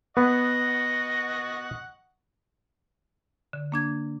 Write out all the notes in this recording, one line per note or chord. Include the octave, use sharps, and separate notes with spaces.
B3 D#5 F#5 C#6
D3
A#3 D4 G#6